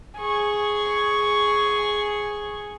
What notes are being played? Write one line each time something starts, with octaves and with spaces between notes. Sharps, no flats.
G#4 C#6